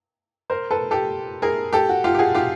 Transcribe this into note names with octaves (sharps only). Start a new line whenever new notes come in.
A#4 C5
A4 B4
G4 A4
G#4 A#4
G4 A4
F#4
F4 G4
G4
F#4 G#4
F4 G4